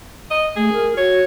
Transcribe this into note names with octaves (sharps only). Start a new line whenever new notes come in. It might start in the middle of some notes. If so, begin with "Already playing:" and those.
D#5
A3 G#4
A#4
F#4 C#5